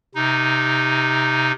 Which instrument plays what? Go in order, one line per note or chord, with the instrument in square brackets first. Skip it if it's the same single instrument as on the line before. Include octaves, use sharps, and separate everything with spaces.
[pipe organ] C3 D#4